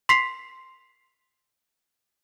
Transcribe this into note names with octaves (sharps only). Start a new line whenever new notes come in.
C6 B6 C7 F7